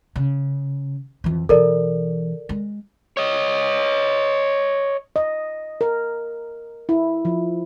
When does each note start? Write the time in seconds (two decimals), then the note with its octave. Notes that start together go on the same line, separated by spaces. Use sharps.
0.16 C#3
1.24 F2 E3
1.49 B2 E3 A4 A#4 D5
2.49 G#3
3.17 C#5 D#5
5.16 D#5
5.81 A#4
6.89 E4
7.25 F3